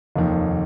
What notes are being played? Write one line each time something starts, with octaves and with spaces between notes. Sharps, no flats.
F1 D#2 D#3